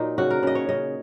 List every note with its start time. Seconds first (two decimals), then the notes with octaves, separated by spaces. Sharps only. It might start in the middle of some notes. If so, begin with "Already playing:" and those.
Already playing: A#2 F#3 D#4
0.18 C#3 F#4
0.30 A#4
0.43 C#3 D#5
0.55 C#5
0.69 C#3 D#5